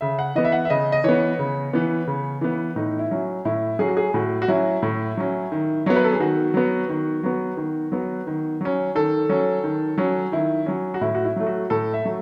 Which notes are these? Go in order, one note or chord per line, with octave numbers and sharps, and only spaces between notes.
C#3 E5
F#5
E3 B3 D#5
E5
F#5
E5
C#3 D#5
D#5
E3 B3 C#5
C#3
E3 B3
C#3
E3 B3
A2 D#4
E4
F#3 C#4
A2 E4
F#3 C#4 G#4
F#4
G#4
A2 F#4
F#4
F#3 C#4 E4
A2
F#3 C#4
D#3
F#3 B3 C#5
B4
A4
G#4
D#3 F#4
F#3 B3
D#3
F#3 B3
D#3
F#3 B3
D#3
F#3 C#4
D#3 A4
F#3 C#4
D#3
F#3 C#4
D#3 E4
F#3 C#4
F#4
A2 E4
F#4
E4
F#3 A3
F#4
A2 A4
E5
F#3 A3